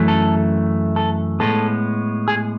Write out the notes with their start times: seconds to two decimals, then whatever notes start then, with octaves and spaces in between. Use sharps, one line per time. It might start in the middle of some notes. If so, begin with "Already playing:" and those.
Already playing: F#2 E3 A3
0.08 A4
0.96 A4
1.40 A2 G#3 B3 A4
2.28 G#4